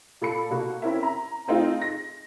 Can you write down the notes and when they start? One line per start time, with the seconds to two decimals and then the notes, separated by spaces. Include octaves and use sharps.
0.21 A#2 A4 B5 C#7
0.50 B2 A#3 F#4
0.82 C4 C#4 E4 A#4 E5
1.03 A#5
1.48 A3 C4 D#4 F4 G#4
1.82 A#6